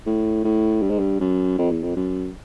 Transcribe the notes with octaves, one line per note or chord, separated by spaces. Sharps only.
A2
A2
G2
G#2
G2
F#2
F2
E2
F2
F#2